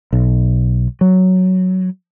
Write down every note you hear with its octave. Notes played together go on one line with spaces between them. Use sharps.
B1
F#3